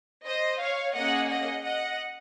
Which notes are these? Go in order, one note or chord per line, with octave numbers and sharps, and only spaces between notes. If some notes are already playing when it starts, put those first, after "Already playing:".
C5 D#5
C#5 F5
A#3 C#4 G#4 D#5 F#5
D#5 F#5
D#5 F#5